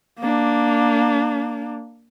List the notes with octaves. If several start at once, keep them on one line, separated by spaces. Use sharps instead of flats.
A#3 D4